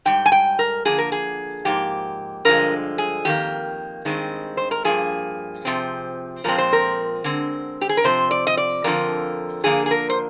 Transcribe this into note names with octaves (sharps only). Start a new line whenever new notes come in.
G#2 G3 G5
G#5
G5
A#4
D3 F3 A#3 G#4
A#4
G#4
G#2 F3 A#3 G4
G2 D3 F3 G#3 A#4
G#4
F2 D#3 A#3 G4
G2 D#3 G#3 C4
C5
A#4
G2 F3 A#3 G#4
C3 F3 C4
A#2 F3 G#3 C4 A#4
C5
A#4
D3 G#3 C4
G4
G#4
A#4
C3 F3 C4 C5
D5
D#5
D5
F2 D3 F3 A#4
D3 F3 A#3 G#4
G#4
A#4
C5